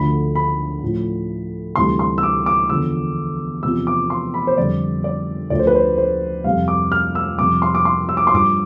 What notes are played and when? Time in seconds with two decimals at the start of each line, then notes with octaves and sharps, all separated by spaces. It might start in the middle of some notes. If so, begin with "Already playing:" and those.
Already playing: D2 D3 F3 B5
0.35 B5
0.82 A2 F3
1.76 D2 C3 E3 G3 C6
1.99 C6
2.18 E6
2.23 D6
2.46 D6
2.69 E2 D3 F3 E6
3.63 E2 C3 F3 E6
3.87 D6
4.10 C6
4.34 B5
4.47 C5
4.57 F2 D3 G3 D5
5.04 D5
5.50 D2 D3 F3 D5
5.59 C5
5.67 B4
5.75 C5
5.98 C5
6.44 F2 C3 G3 F5
6.68 D6
6.92 F6
7.15 E6
7.38 F2 C3 G3 D6
7.62 C6
7.75 D6
7.85 C6
8.09 E6
8.17 D6
8.27 C6
8.33 G2 F3 D6